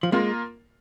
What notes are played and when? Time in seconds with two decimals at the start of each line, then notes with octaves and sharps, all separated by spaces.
0.03 F3
0.12 G#3 A#3 F4 A#4